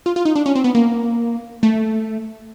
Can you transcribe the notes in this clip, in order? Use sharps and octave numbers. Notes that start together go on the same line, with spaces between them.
F4
F4
D#4
D4
C#4
C4
B3
A#3
A3